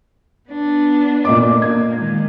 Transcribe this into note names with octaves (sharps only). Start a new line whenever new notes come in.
B3 D4
A#2 D#5 D6
A#3 G#6
D#3 G#3